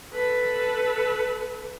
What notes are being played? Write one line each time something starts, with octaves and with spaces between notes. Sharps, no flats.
A4 B4